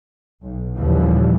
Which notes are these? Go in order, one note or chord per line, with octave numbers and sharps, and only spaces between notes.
B1
D#2 A#2 C#3 E3 F3 G3